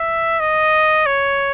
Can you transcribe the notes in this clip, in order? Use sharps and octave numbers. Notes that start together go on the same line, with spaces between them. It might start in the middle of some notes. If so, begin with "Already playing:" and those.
Already playing: E5
D#5
C#5